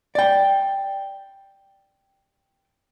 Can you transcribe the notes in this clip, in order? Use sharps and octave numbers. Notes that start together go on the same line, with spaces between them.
D5 G5